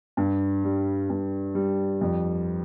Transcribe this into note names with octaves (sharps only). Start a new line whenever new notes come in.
G2
G3
G2
G3
F2